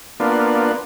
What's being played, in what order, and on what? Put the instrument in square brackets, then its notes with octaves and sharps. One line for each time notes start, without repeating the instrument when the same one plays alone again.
[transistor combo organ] A#3 B3 D4 F4